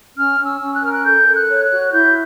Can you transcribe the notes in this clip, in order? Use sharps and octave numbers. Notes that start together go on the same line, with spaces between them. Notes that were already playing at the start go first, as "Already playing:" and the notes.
C#4 F6
C#4
E6
C#4
F#6
A#4 F6
F#6
A4 G6
A4
F#6
C#5
F#6
F#4
E4 G6